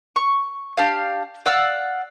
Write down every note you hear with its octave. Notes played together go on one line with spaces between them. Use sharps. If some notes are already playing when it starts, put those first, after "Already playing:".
C#6
D4 G4 F5
D5 F5 F#5 E6